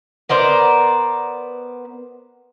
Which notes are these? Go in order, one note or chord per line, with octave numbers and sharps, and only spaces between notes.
B3 A#4 C5 D5